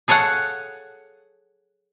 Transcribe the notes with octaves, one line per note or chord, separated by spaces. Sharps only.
G#4 A4 C#5 F5 F#5